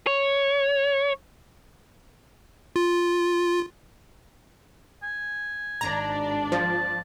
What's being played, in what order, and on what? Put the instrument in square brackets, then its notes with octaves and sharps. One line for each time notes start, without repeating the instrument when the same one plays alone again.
[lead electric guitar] C#5
[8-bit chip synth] F4
[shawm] G#5
[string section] G#1 D4 D5 [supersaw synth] A#5
[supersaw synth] F3 [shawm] A5